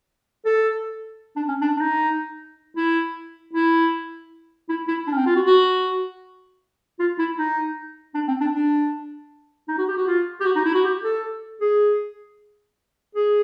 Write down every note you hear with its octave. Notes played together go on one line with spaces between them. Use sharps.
A4
D4
C#4
D4
D4
D#4
E4
E4
E4
E4
D4
C#4
C4
F4
F#4
F#4
F4
E4
D#4
D4
C4
D4
D4
D#4
F#4
G4
F#4
F4
G4
F#4
D#4
E4
F#4
G4
A4
G#4
G#4